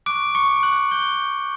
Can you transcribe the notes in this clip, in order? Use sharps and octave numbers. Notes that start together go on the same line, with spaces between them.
C#6 D6 F#6 D7
C#6 C#7
F#6 F#7
G6 G7